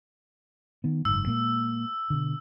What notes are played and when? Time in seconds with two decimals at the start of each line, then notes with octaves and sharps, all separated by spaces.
0.84 D#3 B3
1.05 F#1 G#2 E6
1.27 A#2 G#3 A#3
2.10 B2 D3